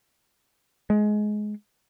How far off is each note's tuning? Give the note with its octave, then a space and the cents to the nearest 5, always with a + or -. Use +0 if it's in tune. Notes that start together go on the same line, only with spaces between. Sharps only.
G#3 +20